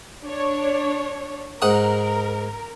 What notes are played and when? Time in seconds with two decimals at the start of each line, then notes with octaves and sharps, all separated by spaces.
0.24 D4 C#5
1.62 G#2 A#4 F#5 D#6